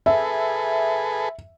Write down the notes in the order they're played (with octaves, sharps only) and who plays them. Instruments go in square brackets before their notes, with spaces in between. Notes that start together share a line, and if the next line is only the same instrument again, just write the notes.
[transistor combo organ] G#4 A4 B4 [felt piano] E5